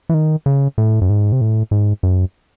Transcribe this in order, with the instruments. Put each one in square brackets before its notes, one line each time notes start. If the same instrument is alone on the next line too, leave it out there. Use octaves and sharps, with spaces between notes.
[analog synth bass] E3
D#3
C#3
A2
F#2
G#2
C3
A2
G#2
F#2